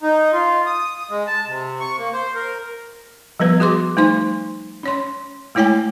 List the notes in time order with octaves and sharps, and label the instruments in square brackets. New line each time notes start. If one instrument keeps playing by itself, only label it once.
[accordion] D#4
F4
D#6
G#3
A5
C3
C#6
A#3
C5
A#4
[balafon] F3 G3 B3 B4
F#4 G#4 C6 D6
G3 A3 D#4 C5 C6
C#4 C#5 C6
G#3 A3 E4 C#5 G5 G#5